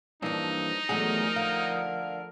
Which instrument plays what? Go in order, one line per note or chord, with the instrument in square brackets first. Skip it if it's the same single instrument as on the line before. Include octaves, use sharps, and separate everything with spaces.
[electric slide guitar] G2 E3 A#3 [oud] F3 D4 [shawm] D#4
[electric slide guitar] E2 F#3 G#4 [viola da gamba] F3 A#4 [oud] A3 D4 F#4
[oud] D3 [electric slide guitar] F5